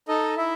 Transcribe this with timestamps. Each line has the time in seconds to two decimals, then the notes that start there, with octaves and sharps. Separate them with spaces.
0.08 D#4 A4 D#5
0.37 E4 E5